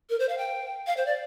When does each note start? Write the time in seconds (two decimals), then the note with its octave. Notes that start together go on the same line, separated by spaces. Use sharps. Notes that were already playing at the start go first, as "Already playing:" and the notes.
0.10 A#4
0.19 C5
0.29 F5
0.38 G5
0.87 F5
0.97 C5
1.06 D5